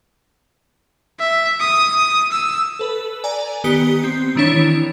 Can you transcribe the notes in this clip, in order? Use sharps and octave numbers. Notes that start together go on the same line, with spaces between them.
E5
D#6
E6
A4 B4
D5 G#5 A#5
D#3 B3 G4 D#6 C#7
C4
D#3 E3 D4 E4 C#5